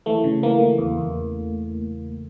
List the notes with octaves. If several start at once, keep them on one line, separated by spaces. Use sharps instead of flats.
E3 A3
C#3
E3 A#3
E3
E2
E2